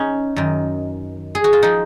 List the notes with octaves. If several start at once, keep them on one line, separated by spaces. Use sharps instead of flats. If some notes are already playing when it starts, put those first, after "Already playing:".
Already playing: C#4 D#4
F#2 D#3
G#4
F#4
F4
F3 D#4